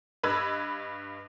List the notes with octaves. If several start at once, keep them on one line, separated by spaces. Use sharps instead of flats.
G2 B4 D#5 B5 E6 G#6